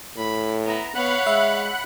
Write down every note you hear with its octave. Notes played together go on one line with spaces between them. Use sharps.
A2 B5
B3 E4 A#5
B3 C#5 F5 F#5 B5 F#6
G#3 E5